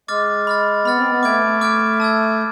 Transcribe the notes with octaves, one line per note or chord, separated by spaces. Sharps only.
G#3 D6 F6 A6
B5 F6 A6
B3 B5 F6 A6
C4
B3
A3 D6 F6 G#6 D7
D6 F6 G#6 D7
A5 E6 G#6